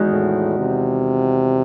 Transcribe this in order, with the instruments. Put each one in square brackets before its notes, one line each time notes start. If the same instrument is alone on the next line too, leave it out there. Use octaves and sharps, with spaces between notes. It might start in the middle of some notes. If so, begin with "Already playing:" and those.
Already playing: [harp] E2 D#3 G#3 D#4 F#4
[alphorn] A2
C3